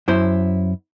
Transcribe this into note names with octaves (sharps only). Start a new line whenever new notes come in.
F#2 E4 C5